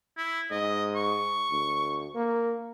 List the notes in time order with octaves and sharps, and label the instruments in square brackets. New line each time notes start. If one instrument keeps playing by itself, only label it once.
[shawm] E4
[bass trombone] G#2 [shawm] D#5
[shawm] C#6
[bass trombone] D2
A#3